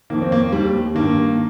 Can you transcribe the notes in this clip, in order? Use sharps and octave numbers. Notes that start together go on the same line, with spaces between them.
F2 D#3 A#3
C4
A#3
D#2 D#3 G3
G2 D#3 A#3